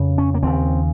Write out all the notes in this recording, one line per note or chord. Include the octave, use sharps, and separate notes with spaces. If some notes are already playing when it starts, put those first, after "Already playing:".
Already playing: F2 C#3
C#4
A#3
D#2 C#3 C4